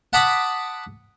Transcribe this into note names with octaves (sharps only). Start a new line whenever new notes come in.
F#5 A5 B5 D6 D#6